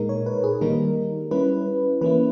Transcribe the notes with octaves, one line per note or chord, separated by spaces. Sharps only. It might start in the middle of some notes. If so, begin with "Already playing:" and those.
Already playing: A#2 G#3 D#4 A#4
C#5
B4
G#4
D#3 G3 A#3 D#4 A#4
G3 C#4 E4 B4
E3 A#3 C#4 E4 B4